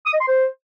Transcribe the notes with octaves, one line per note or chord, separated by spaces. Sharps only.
D#6
D#5
C6
C5